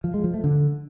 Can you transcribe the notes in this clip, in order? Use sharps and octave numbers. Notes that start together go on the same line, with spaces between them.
F3
G#3
F3
A3
D3